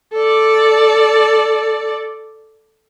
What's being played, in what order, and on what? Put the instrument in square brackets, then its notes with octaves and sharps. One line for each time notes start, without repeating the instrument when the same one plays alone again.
[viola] A4 D5